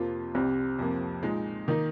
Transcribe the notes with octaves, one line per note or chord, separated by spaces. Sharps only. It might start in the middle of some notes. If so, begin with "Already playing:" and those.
Already playing: F2 C3 F3 A#3 F4
C2 C3 G3 C4
F2 C3 F3 A#3
A#2 G#3 D#4
D#3 A#3 D#4